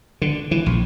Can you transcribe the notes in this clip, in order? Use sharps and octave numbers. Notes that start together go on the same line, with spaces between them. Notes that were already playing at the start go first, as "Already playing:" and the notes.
D3
E3
A#1